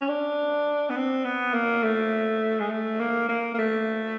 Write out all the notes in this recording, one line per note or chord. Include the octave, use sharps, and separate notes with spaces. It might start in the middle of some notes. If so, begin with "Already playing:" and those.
C#4
D4
B3
C4
B3
A#3
A3
G#3
A3
A#3
A#3
A#3
A3